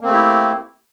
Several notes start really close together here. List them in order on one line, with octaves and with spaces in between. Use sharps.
A#3 C4 A3 G4 E4